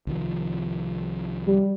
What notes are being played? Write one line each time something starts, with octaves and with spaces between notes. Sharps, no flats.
C2 D#3 F3
G3